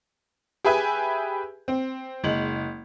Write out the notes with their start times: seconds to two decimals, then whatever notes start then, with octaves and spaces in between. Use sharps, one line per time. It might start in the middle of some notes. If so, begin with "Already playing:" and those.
0.65 G4 G#4 B4 E5 G#5
1.68 C4
2.24 F#1 G#3 F#7